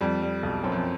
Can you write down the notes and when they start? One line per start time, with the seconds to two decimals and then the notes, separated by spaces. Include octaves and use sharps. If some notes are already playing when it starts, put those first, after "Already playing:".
0.01 F2 G3
0.22 G3
0.43 B1
0.64 F#2 C4
0.72 F2